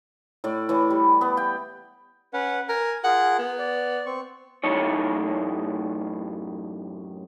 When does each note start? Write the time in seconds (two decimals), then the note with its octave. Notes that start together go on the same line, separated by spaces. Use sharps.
0.44 A2 D5
0.69 A2 E3
0.90 G3
1.21 B3
1.37 G5
2.34 C#4 B4 F#5
2.69 A#4 G#5
3.04 F4 G#4 A#4 F#5
3.39 B3
3.59 D5
4.06 C4 C#6
4.64 F#2 A2 A3 D#4 C#5